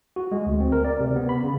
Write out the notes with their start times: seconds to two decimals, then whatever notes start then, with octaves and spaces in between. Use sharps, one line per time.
0.16 F#4
0.32 G#3
0.47 D2
0.60 C4
0.72 A#4
0.85 D5
1.00 C3
1.16 B3
1.29 B5
1.44 C#3